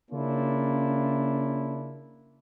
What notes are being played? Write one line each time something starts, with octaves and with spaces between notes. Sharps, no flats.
C#3 A#3 C#4 D4 E4 F4